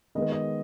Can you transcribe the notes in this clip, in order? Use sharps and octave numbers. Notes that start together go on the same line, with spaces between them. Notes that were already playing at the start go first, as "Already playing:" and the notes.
D#3 G#3 B3 D#5
D#5